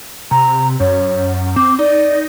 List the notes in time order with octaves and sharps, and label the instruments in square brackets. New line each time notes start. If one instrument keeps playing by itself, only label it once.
[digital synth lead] C3 [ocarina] A#5
[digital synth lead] F#2 [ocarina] C#5
[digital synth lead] C4 [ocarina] D6
[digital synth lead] D#4 [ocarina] D5